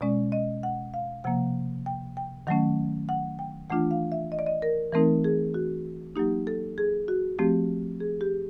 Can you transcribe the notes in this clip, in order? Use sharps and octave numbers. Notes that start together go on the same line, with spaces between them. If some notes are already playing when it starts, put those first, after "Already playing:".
B2 G#3 C#4 D5
D#5
F#5
F5
C3 F3 A#3 F#5
G5
G5
D#3 F#3 A3 C#4 F#5
F#5
G5
E3 A3 D4 F4 F#5
F5
E5
D#5
D5
D#5
A#4
E3 A3 C4 D#4 A#4
G#4
F#4
F#3 A#3 D#4 G4
A4
G#4
F#4
F3 A3 C4 G4
G#4
G4